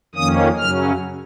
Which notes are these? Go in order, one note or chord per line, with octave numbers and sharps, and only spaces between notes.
F2 D#3 A#3 C#4 D#6
F#2 C#3 F#3 C#4 F6